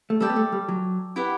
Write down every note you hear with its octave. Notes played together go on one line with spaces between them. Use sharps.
A3
G3 A4 D5 G5
B3
A3
G3
F#3
E4 G4 B4 F#5